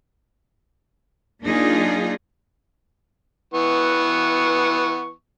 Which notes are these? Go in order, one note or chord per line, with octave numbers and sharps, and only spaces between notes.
F#3 A#3 D4 D#4 F4 G#4
E3 B3 C#6